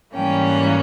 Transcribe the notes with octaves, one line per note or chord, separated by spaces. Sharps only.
G#2 E3 G3 A#3 C#4 G5
F#5